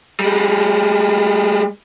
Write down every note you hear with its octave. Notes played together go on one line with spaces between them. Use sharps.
G3 G#3